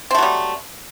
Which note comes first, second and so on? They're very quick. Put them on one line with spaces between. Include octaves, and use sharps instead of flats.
C4 A3 F#3 G3